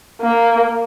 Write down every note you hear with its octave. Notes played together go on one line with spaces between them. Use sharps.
A#3